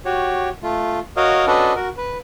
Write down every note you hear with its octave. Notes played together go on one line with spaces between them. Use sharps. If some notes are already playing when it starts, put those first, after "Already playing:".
F#4 G4 C#5
A3 F4
F#4 A#4 C#5 D#5 F5
C#4 D4 F#4 A4 B4 D#5
F#4 A#4
B4